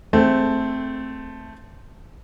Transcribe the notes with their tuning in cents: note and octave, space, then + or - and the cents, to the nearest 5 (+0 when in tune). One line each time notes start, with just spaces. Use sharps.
A3 +0 C4 +0 G#4 +0